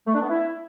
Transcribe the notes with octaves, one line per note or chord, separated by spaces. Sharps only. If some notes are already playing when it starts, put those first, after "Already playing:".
A3
D4
B3
E4